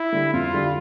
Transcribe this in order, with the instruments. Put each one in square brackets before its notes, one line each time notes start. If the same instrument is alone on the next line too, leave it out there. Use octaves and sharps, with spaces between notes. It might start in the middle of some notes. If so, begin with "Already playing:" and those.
Already playing: [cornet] E4
[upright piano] D3 G3
[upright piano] F2 [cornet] F4
[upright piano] D3 G3